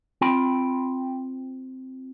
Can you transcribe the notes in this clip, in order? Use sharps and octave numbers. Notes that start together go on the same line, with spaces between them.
C4 F4 G5 B5